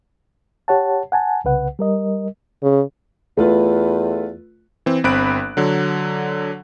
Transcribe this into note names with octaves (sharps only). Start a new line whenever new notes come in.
G4 C#5 F#5 A5
F#5 G#5 A5
C2 C#3 B4 F#5
G3 A#4 D#5
C#3
E2 A3 F4 B4
E3 C4
G1 C4 B5 F#6 D7
D3 F#3